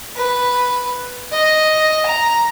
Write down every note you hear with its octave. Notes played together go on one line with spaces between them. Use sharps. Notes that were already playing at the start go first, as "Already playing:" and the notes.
B4
D#5
A#5